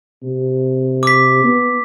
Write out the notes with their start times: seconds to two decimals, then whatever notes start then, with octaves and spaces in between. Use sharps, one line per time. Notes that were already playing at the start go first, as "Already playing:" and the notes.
0.23 C3
1.03 D6 B6
1.44 B3